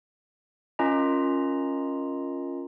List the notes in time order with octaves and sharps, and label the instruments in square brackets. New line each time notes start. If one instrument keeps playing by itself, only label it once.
[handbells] C#4 F4 A#4 D#5 A#5